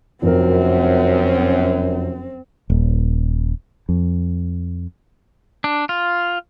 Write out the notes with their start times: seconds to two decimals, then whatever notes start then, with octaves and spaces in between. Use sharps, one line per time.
0.22 F1 F#2 C4 A#4
2.70 D#1
3.89 F2
5.64 D4
5.89 F4